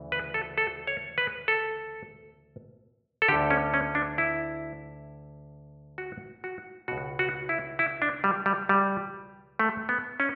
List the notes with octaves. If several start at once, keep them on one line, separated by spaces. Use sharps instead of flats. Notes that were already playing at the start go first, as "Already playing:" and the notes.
Already playing: D2 C#3 E3
B4
A4
A4
C#5
B4
A4
A4
D2 D3 G4
C#4
C#4
D4
E4
F#4
F#4
C#2 B2 F#4
F#4
E4
E4
D4
G3
G3
G3
A3
B3
C#4